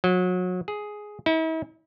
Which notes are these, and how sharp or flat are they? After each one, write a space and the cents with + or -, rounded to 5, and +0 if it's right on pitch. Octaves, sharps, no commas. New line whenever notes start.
F#3 -30
G#4 +5
E4 -45